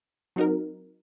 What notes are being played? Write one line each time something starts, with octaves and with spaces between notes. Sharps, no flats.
F#3 C4 D#4 F#4 A#4